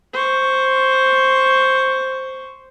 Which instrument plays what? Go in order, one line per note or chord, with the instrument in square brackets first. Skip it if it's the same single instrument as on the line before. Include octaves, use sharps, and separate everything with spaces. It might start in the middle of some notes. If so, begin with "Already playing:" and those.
[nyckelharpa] C5 C#6